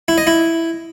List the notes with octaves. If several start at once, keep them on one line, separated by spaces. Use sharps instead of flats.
E4
D#5
E4